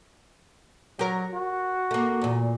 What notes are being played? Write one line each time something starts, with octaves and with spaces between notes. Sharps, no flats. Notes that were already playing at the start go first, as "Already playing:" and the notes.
F#3 G4 A#4
F#4
A3 A#3
E2 A#2